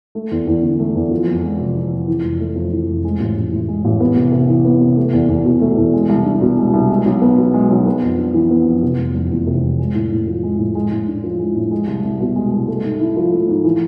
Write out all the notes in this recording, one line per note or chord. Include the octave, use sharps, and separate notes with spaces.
A3
E2
E2
D3
A3
E2
F3
F2
G#3
C3
F3
F2
E3
F1
A3
F2
E3
F1
G#3
A1
A1
A2
G#3
A1
B3
C3
C3
E3
B3
C3
A3
E2
E2
B2
A3
E2
G#3
C2
D4
B2
G#3
C2
G#3
B1
B3
B2
G#3
B1
B3
F2
D4
E3
B3
F2
C3
F1
F1
E2
C3
F1
G#3
A2
A2
F3
G#3
A2
G#3
A2
D4
F3
G#3
A2
G#3
C2
C2
B2
G#3
C2
A3
G#2
E4
F3
A3
G#2
E3